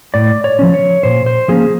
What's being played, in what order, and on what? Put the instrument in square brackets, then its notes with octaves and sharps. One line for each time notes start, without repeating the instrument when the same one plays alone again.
[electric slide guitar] A2 D5
C#5
F3 G#3 C#4
C#5
A#2 C5
C5
F3 A#3 C#4 G#4